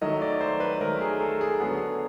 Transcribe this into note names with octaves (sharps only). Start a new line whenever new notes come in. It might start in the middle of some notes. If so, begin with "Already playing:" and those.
D#3 F#3 A3 D#5
D5
C5
B4
D#3 F#3 A3 A#4
G#4
A4
G#4
D3 F#3 B3 G#4